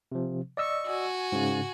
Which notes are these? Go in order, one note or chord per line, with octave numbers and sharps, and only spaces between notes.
C3 F3
D5 D#5 C#6 E6
F#4 G#5
G#2 C#3